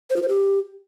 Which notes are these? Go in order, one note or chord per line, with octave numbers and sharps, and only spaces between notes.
C5
F4
C5
G4